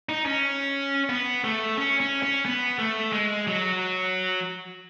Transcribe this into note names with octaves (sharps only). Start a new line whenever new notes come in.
D#4
C#4
B3
A3
C#4
C#4
C#4
B3
A3
G#3
F#3